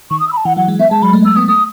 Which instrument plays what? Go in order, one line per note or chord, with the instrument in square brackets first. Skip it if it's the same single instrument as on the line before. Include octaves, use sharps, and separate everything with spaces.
[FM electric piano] D#3 [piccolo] C#6
[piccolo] D#6
E6
B5
A5
[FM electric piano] E3 [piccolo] F#5
[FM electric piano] F#3 [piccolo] F#5
[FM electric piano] G#3
[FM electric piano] B3 [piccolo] E5
[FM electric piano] G#3 [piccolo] A5
[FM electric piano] F#3 [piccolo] B5
[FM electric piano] A3
[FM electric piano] A3 [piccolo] E6
[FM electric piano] B3 [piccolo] D#6
[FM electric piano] A3 [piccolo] D#6